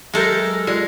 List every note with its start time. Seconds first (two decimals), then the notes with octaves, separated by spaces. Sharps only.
0.14 F#3 G#3 G4 A4 A#4 G6
0.67 G#3 F4 G4 D5